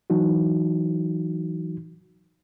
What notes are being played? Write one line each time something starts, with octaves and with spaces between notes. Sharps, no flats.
E3 F#3 D#4 F#4